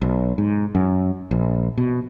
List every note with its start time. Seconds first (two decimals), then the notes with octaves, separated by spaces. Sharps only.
0.02 B1
0.38 G#2
0.75 F#2
1.31 A#1
1.77 B2